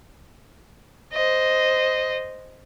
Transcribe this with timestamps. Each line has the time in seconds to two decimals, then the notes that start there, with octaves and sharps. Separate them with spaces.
1.13 C5 D#5